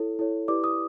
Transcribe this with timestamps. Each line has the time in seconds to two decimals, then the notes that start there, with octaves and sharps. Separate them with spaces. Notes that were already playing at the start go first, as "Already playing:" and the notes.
Already playing: E4 A4 C#5
0.19 E4 A4 C#5
0.48 E4 G4 B4 D5 D6
0.64 D#6